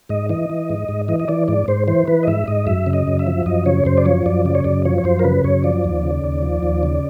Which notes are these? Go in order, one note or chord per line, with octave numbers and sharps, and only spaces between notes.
G#2 D#5
E3 D#5
E3
G#2
G#2
E3 D#5
D#5
E3 D5
G#2 D5
G#2 C5
E3 C5
E3 B4
D#5
G#2 E5
G#2 D#5
F#2 E5
C#3
D#5
F#2
E5
F3
F#2 D#5
C#3 C#5
F#2 C5
D5
F3 C#5
F#2 D5
C#3 D5
C#5
F#2 D5
F3 C#5
C#5
F#2 C5
A#4
C#3 B4
F#2 C#5
F3 D5
D#2
C#3
D#2
F3
D#2
C#3